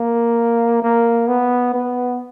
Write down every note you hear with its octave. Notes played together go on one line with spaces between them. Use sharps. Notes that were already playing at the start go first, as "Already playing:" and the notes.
Already playing: A#3
A#3
B3
B3